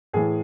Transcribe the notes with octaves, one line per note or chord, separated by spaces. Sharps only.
A2 E3 G#4